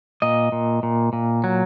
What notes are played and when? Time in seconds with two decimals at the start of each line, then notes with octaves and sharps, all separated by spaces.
0.22 A#2 D#5
0.52 A#2
0.83 A#2
1.13 A#2
1.44 F#3